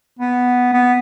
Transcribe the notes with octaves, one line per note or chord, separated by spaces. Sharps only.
B3
B3